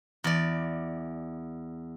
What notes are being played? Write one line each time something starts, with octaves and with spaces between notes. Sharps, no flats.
E2 D5